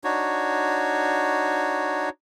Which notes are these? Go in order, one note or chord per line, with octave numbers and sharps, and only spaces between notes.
D4 D#4 F#4 C#5